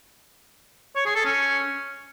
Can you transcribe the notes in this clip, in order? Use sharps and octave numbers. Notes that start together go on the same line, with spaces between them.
C#5
G#4
A4
C#4